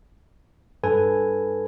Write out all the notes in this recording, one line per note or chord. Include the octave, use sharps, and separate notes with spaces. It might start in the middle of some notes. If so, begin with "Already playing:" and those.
G2 A4 B4 G#5